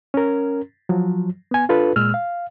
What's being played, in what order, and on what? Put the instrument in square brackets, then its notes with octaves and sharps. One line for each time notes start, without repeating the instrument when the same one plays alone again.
[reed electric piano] C#4 A#4
F3 F#3
B3 G#5
D4 F4 A4 B4
A#2 G#3 E6 F6
F5